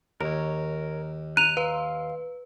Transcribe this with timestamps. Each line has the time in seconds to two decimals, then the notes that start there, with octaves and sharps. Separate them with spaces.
0.21 D#2 A#4 C#5
1.37 A#5 F#6 D#7 F7
1.57 B4 F5 C6